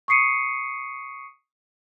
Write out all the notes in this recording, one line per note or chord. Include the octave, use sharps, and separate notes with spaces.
C#6 D#6 C7 C#7 D#7